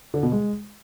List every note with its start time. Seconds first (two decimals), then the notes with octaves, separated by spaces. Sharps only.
0.14 D3
0.23 B2
0.32 G#3